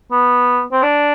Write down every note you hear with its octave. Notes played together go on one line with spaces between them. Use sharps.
B3
C4
D4